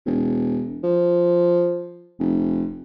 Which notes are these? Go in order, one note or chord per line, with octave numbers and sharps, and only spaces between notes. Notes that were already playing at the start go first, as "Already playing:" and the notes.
E1
F3
F1